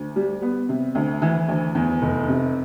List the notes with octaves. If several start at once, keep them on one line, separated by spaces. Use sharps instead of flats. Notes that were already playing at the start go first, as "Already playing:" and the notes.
Already playing: D2
G3
B3
C3
D2
E3
D2
E2
F1
C3